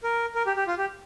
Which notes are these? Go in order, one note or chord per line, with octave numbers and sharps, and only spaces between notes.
A#4
A#4
G4
G4
F4
G4